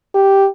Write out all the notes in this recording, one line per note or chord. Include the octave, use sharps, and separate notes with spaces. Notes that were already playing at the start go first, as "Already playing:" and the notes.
G4